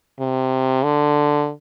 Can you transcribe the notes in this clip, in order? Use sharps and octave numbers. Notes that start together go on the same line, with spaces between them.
C3
D3